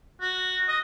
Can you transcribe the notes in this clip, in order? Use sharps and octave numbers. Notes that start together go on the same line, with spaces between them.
F#4
D#5